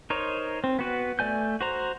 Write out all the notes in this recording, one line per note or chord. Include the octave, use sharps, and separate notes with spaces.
D#4 A#4 C5 C#5
C4
B3 F#4 B4
A3 D5 G#5 G6
F#4 C5 A#5